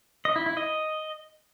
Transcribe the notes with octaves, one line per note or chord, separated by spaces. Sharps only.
D#5
E4
E4
D#5